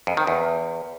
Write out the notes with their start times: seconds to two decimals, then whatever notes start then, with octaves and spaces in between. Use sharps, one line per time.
0.07 F2
0.17 D#3
0.27 E2